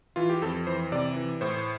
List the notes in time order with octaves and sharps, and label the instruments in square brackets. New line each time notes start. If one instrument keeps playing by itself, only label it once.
[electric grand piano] E3 F4
G4
F2 A4
E3 C5
C3 D5
E3
A2 C5